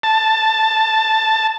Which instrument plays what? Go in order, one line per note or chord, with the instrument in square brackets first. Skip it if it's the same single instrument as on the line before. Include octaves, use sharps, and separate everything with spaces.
[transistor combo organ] A5